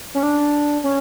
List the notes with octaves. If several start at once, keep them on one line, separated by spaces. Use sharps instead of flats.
C#4
D4
C#4